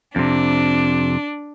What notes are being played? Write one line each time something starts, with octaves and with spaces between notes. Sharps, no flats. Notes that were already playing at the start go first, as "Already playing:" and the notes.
F2 C3 D4